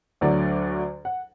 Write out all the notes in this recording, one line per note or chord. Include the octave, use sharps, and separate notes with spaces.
D2 D3 F#3 D5
F#5